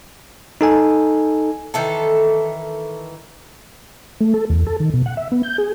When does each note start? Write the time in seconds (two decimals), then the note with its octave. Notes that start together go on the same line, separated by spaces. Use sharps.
0.61 D#4 A4 G#5
1.74 D#3 E3 A4
4.21 A3
4.34 A4
4.50 E2
4.67 A4
4.80 D#3
4.94 B2
5.06 F#5
5.17 E5
5.32 B3
5.43 G6
5.58 G#4